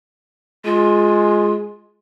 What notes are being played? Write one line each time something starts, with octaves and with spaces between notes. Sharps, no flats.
G#3 F4